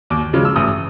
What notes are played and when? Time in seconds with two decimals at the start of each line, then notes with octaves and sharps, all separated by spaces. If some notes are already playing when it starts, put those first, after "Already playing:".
0.10 D#2 D6
0.33 C#3 F3 G#3
0.45 E6
0.56 A1 D#6